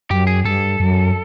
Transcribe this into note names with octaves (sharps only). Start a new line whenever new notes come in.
F#2 G4
G#4
G2 A4
F#2